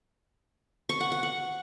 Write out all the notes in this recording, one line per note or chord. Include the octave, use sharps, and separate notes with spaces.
C#6
F#5
F#5
F#5